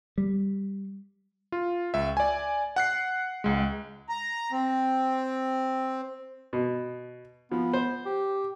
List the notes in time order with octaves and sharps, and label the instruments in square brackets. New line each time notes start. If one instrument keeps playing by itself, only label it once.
[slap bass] G3
[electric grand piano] F4
C#2 E5
D5 G#5
F#5 F#6 C7
C#2 G#3
[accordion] A#5
C4
[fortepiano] B2
[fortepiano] F3 [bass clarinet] B3
[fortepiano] C5
[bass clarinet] G4